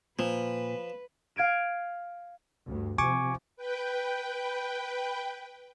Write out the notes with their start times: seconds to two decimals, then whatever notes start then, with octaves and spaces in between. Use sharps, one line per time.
0.19 A#2 F3 B4
1.36 F5 G#6 D7 E7
2.66 D2 G2
2.98 C3 F3 G#5 C#6 D6
3.56 B4 G5